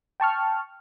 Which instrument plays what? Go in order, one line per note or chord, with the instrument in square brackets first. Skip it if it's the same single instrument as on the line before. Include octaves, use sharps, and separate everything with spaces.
[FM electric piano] G5 A5 C#6 F6